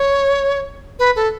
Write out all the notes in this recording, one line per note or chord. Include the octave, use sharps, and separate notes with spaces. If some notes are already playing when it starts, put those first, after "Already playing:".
Already playing: C#5
B4
A4